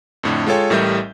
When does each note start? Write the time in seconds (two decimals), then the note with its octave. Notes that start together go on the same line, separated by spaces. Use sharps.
0.23 F2 A2 D3
0.47 G#3 F4 A4 C#5 G5
0.70 A1 A2 G3 A#4 E5 G6